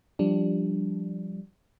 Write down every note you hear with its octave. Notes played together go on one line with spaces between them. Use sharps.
F3 G3 D4